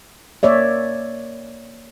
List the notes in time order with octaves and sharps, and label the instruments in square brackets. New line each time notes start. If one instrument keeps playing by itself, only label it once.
[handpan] A#3 C#5 D5 E5